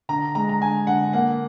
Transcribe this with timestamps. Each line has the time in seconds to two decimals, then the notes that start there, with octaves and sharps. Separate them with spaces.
0.09 D3 A#5
0.35 G#3 A#5
0.49 A#5
0.61 D3 G#5
0.87 D3 F#5
1.13 A#3 F#5